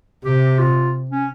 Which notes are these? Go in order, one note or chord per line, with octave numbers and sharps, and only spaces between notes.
C3 G4
F4
C#4